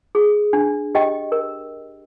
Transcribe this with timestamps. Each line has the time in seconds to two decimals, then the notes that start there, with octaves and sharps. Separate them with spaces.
0.15 G#4
0.53 D4
0.95 G4 D#5 G5
1.32 A#4